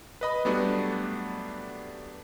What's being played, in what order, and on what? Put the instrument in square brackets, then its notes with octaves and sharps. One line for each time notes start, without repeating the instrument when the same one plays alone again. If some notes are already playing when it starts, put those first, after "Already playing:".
[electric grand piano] B4 D#5 B5
F#3 G3 A3 B3 D4